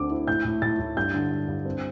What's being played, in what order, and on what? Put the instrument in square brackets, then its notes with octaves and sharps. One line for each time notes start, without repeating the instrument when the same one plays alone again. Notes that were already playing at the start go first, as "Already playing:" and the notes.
Already playing: [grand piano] D2 D3 C4 D6
E4
A2 G6
A2
A2 A6
A2
G2 G6
D3
D3
G2
C4